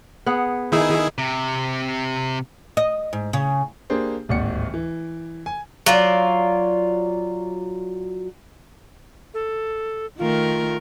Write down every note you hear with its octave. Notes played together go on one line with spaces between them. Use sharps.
B3 G#4 F#5
D#3 D#4 E4 G#4 E5
C3
D#5
G#2
C#3
A#3 D4 G4 G#4 C5
D1 G#1 D#2 D5 F#5 C#7
E3
G#5
F#3 F4 D5
A4
D#3 A3 F4 A#4